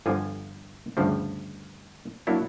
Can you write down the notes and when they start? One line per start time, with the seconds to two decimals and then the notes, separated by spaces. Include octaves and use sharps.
0.06 G1 D3 F3 G#5
0.97 D2 G2 C#3 F3
2.27 F#3 A#3 D4 E4 C#5